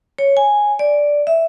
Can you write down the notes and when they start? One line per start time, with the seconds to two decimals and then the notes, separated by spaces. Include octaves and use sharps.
0.19 C#5
0.37 G#5
0.79 D5
1.27 E5